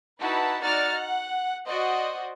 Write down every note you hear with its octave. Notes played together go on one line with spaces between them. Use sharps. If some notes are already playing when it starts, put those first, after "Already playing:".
D#4 E4 F#4 B4 A5
D#4 F#4 D5 A#5 F6 A6
F#5
F#4 C5 D5 D#5